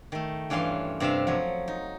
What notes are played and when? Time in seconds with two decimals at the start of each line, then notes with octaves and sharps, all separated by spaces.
0.12 D#3 A3
0.50 G2 E3 C#4 F4 F5 C6
1.00 G2 C3 E5 F5
1.27 F3 F#3 C#5
1.68 D#4